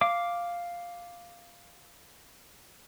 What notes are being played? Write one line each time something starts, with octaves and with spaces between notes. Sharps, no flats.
F5 D6